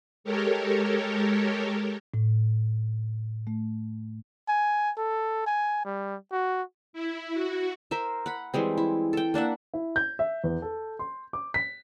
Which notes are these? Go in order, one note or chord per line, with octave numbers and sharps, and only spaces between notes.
G#3 G4 A4 A#4 C#5
A2
A3
G#5
A4
G#5
G3
F#4
E4
F#4
A#4 C5 E5
F#5 B5
E3 G3 G#3 C4
E4
A4 G5
A#3 D4 E5 F#5
E4
G6
E5
E2
A4
C6
D6
B6